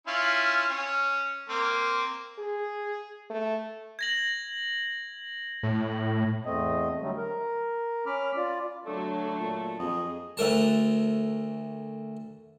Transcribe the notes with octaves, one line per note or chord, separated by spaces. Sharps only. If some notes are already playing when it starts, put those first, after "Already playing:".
C#4 E4 F4
C#4
A#3 C4
G#4
A3
G#6 A#6 F#7
A2
E2 A3 C4 D#5
D3 F#3 G3 A3
A#4
C#4 B5 D6 F6
F4 D5
D3 F#3 A3 A4
A#2
F2 G#4 D#5
D2 A3 A#4 A5